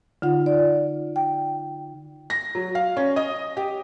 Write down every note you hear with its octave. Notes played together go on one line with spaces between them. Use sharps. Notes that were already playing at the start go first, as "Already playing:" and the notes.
D3 D#4 F4 F#5
D5
G5
A#6
F#3
F5
C#4
D#5
G4